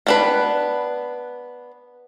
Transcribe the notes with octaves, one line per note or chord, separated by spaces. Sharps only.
B3 D4 B4